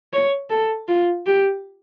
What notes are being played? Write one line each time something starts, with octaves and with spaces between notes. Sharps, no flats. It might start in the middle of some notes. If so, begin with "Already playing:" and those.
C#5
A4
F4
G4